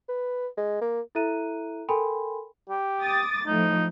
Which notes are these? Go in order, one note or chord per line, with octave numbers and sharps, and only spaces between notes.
B4
G#3
A#3
E4 A4 E5 A#5 F#6 D#7
A4 A#4 G5 G#5 B5 C6
G4
D6 D#6 A6
A2 F3 D#4